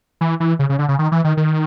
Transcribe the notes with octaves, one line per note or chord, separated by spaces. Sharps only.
E3
E3
C#3
C#3
D3
C#3
D#3
E3
D#3
D#3